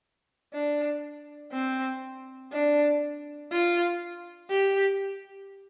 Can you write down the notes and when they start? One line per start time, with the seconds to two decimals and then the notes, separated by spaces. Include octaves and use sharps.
0.54 D4
1.53 C4
2.52 D4
3.51 F4
4.50 G4